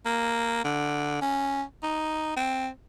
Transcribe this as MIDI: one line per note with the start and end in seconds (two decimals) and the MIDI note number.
0.06 0.64 58
0.65 1.17 50
1.21 1.63 61
1.83 2.34 63
2.36 2.69 60